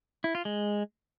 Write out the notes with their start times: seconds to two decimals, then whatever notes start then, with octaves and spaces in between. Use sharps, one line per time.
0.24 E4
0.35 F4
0.45 G#3